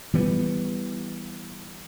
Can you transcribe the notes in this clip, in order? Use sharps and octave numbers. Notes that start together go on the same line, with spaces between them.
E3 G3 B3